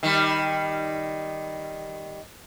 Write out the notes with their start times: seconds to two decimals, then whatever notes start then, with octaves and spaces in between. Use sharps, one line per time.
0.03 D#3 G3